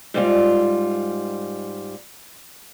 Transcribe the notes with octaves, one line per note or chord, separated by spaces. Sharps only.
G#2 G3 F4